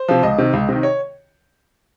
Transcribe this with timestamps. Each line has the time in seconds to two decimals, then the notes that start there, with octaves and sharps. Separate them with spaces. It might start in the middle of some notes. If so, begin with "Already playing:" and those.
Already playing: C5
0.09 C3 F3
0.23 C#2 D#5
0.38 C3 D#3
0.53 C#2
0.69 C3 D#3
0.83 C#5